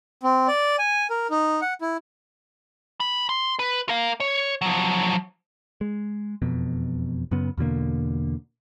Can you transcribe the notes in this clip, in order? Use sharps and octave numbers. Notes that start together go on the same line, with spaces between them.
C4
D5
G#5
A#4
D#4
F#5
E4
B5
C6
B4
A#4 F5
C#5
F3 F#3
G#3
E1 F2 B2
F#2 C#3 B3
E2 B2 D3 A#3